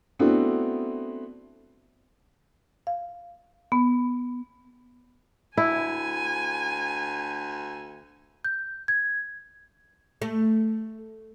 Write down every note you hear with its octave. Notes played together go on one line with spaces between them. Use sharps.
A3 B3 C4 D4 E4 F#4
F5
B3
D2 E4 G#5
G6
G#6
A3